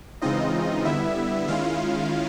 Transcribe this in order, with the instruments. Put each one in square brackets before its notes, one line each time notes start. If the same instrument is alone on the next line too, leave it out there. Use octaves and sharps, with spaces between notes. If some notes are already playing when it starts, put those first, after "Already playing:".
[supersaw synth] C#3 E3 G#3 C4 D#4 F4 D#5
D3 G3 B3 E4 E5
D#3 G#3 C#4 E4 F4 F5